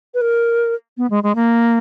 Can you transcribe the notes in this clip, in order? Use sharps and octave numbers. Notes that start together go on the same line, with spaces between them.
B4
A#4
B3
G#3
G#3
A#3